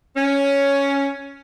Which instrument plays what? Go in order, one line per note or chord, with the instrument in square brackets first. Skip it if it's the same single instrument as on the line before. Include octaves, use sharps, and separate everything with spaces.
[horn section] C#4